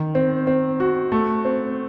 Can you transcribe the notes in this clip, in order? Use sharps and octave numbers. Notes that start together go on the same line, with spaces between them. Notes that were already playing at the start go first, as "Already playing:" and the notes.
Already playing: D#3
C4
C4
F#4
A3
C4